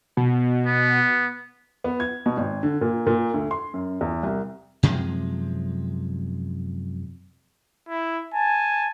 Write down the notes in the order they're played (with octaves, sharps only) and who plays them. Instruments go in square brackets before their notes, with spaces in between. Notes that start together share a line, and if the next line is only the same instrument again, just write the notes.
[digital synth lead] B2
[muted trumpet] B3
[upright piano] B3
G#6
B2
G#1
D3
A#2
A#2
D2
C6
F#2
E2
C2
[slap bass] F#2 C3 F3 G#3
[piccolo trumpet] E4
[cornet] G#5 [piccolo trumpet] A5